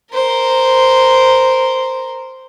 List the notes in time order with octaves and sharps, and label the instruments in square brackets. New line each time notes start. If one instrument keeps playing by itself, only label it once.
[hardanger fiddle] A#4 C5